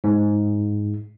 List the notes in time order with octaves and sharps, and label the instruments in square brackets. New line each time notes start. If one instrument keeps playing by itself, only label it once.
[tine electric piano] G#2